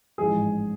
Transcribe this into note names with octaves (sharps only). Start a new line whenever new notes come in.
A1 G#2 F3 G#3 G#4